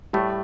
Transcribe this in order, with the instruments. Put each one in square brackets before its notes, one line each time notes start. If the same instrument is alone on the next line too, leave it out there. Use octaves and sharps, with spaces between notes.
[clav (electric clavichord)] A2 A3 [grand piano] G3